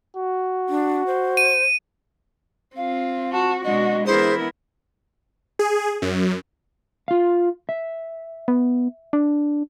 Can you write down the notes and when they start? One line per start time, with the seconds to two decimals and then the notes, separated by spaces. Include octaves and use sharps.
0.17 F#4
0.69 D4
1.07 C5
1.37 D#7
2.76 C4 F4 F5
3.33 F#4 A5
3.64 B2 G#3 D4 F#4 D#5
4.06 E3 B3 E4 G#4 A#4 C5
5.59 G#4
6.02 F#2
7.08 F4 F5
7.69 E5
8.48 B3
9.13 D4